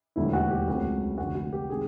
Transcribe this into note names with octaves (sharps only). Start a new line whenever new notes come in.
E1 D#2 D3 F#3 A3 E4
F#4
G4
C#2 C#3 F#3 A3 C4 F#4
F1 F2 D3 F#4
F#4
G4
C3 D#3 G#3 C4 G#4